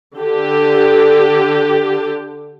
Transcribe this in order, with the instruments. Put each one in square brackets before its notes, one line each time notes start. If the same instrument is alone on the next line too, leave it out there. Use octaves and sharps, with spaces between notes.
[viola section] D3 G4